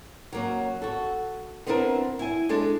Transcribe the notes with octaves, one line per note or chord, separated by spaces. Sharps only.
F#3 A#3 C#4
F#4 A4
B3 C4 D4 E4 G#4 A#4
E4 G#5
G#3 D4 A4